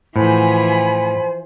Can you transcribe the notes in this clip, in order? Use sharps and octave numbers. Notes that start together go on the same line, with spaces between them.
A2 E3 F3 C5 F#5 G#5 B5